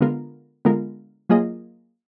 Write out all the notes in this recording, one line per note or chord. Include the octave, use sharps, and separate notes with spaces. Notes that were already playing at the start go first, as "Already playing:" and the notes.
D3 G#3 B3 F4 A#4
D3 G#3 B3 F4 A#4
F#3 A#3 F4 G#4 D#5